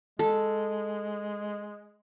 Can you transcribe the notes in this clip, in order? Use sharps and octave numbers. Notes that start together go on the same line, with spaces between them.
G#3 A4